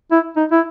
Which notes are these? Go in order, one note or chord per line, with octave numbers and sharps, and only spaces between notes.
E4
D#4
E4